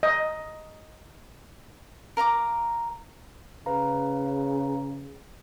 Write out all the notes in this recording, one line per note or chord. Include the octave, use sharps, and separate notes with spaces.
D#5
A#4 F5 A#5 D6
C#3 B4 F5 A#5